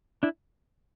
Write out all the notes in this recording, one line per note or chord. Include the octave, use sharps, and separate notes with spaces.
D4 E4